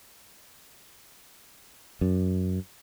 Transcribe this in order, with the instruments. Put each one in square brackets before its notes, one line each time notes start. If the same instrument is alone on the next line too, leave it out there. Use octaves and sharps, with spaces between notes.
[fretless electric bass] F#2